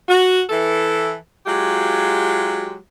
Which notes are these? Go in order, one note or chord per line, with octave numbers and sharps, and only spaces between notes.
F#4
E3 A4
F#3 G#3 F4 G4